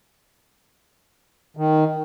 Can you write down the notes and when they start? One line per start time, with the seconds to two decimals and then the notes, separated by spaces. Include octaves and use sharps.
1.57 D#3